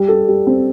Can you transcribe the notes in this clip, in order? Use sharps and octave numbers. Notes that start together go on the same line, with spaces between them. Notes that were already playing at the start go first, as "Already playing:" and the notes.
Already playing: G3
A4
G3
C4